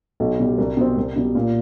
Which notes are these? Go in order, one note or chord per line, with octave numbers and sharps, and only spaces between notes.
B1
B2 G3
C2
B2 G3 C4
C2
B2 G3
A#2